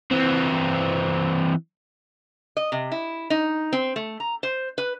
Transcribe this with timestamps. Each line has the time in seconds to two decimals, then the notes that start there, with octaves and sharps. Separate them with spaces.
0.11 E3 C4
2.57 D#5
2.72 C3
2.92 E4
3.30 D#4
3.73 C4
3.96 A3
4.20 A#5
4.43 C5
4.78 B4